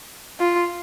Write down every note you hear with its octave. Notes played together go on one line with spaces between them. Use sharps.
F4